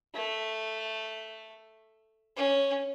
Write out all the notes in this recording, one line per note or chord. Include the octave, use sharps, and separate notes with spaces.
A3
C#4